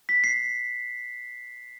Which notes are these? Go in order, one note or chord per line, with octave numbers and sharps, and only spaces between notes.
B6
C7